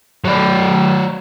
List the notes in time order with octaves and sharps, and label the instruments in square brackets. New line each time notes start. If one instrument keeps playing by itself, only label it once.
[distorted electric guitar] F#3 D5